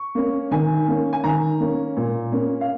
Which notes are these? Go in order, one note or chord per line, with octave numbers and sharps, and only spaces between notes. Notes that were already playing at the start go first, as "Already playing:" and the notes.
Already playing: C#6
A#3 C#4
D#3 G#5
A#3 C#4
G#5
D#3 A#5
A#3 C#4
A#2
A#3 C#4
F5